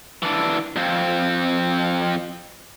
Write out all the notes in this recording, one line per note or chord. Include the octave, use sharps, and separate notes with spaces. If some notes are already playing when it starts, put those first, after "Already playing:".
E3 D4
F2 C4